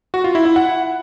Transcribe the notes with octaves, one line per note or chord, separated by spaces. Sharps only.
F#4
F4
E4
E4
F#5